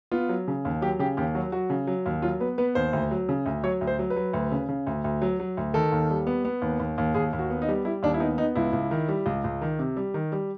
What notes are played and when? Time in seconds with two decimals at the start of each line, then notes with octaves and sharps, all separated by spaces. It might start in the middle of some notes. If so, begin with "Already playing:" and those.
0.11 B3 F4
0.29 F#3
0.48 C#3
0.65 D#2
0.82 F#3 G4
0.99 C#3 G4
1.17 D#2 G4
1.35 F#3 F#4
1.52 F#3 F#4
1.70 C#3
1.87 F#3
2.06 D#2
2.22 F#3 F4
2.40 B3 B4
2.58 B3 B4
2.75 D#2 C5
2.93 D2
3.11 F#3
3.29 C#3
3.46 D2
3.63 F#3 C#5
3.81 D2
3.87 C5
3.99 F#3
4.10 B4
4.16 F#3
4.33 D2
4.51 C#3
4.68 C#3
4.87 D2
5.04 D2
5.22 F#3
5.40 F#3
5.57 D2
5.74 D#3 A4
5.92 D#2
6.10 G3
6.27 B3
6.45 B3
6.62 D#2
6.80 D#2
6.98 D#2
7.15 D#2 G#4
7.33 D#2
7.39 F#4
7.50 B3
7.62 D#4
7.68 G3
7.85 G3 E4
8.03 D#2 D4
8.14 E4
8.20 B3 D#4
8.38 B3 D#4
8.55 C#2 E4
8.73 C#2
8.91 D#3
9.09 G3
9.26 C#2
9.44 C#2
9.62 D#3
9.79 C3
9.97 G3
10.14 D#3
10.32 G3